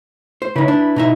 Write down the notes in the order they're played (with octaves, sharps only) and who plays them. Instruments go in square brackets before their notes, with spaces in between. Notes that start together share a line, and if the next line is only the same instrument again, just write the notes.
[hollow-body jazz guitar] C5
[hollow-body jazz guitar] C#3 D#4 [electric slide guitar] E4 B4
[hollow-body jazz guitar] D4
B2 D#4 E5